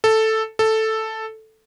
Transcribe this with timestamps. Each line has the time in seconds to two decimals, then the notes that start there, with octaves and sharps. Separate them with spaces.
0.04 A4
0.59 A4